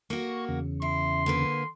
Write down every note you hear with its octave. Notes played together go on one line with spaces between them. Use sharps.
A#3 F#4 C#6
E2 C#3
E4 C6
D3 A#3 B4